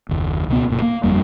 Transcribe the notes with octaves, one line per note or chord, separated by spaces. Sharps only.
F#1 D#2
C#2 B2 G3 B3
F#1 A#2
A#3
G1 F2 G3